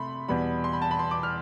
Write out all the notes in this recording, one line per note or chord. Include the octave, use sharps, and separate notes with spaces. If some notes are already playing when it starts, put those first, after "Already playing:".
Already playing: C3 A3 B5 C6
E2 B2 G3 B5
C6
B5
A5
B5
C6
D6
F6